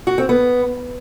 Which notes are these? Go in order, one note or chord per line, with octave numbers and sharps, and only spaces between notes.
F#4
C4
B3